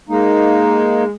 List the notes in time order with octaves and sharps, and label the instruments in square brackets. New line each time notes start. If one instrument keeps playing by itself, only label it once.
[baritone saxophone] G#3 [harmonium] A#3 D#4